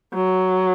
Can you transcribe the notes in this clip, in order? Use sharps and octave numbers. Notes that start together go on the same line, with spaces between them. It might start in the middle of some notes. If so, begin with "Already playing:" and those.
F#3